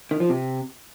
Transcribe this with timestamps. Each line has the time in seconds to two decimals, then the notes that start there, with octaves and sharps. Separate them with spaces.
0.11 D#3
0.20 F3
0.29 C3